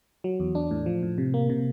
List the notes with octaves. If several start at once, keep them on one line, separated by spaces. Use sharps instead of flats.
F#3
E2
D4
A2
F3
A2
C3
A#3
C3